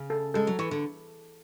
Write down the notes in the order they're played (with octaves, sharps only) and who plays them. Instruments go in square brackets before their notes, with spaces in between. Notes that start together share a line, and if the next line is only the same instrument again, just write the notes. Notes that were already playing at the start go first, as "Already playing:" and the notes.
Already playing: [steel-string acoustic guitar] C#3
[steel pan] A4
[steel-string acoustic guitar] G#3 [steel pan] A4
[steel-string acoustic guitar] F#3
[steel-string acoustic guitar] E3 [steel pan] C#6
[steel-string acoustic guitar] D3